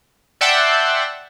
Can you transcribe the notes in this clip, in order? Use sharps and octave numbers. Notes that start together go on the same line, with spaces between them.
D5 E5 F#5 G5 A5 C6